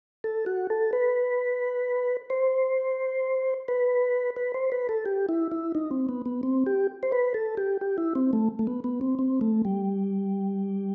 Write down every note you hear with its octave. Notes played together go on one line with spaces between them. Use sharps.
A4
F#4
A4
B4
C5
B4
B4
C5
B4
A4
G4
E4
E4
D#4
C4
B3
B3
C4
G4
C5
B4
A4
G4
G4
E4
C4
A3
A3
B3
B3
C4
C4
A3
G3